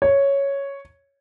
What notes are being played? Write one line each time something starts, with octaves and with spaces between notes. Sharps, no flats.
C#5